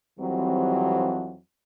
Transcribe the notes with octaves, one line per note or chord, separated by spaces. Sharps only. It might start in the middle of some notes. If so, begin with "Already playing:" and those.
F2 E3 F#3 G3 C4